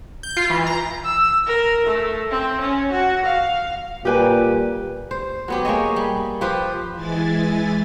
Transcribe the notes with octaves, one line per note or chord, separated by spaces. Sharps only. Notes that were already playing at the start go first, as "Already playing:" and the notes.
G6
F4
E3
A#5
E6
A#4
A3
C4
C#4
F#4
F5
A#2 G3 G4 B4 G#5
C5
F#3 B3 G4
A#3 G#4 C#5 D#5
G3
F3 G4 B4 C5
E3 G#3 E4 G#5 A6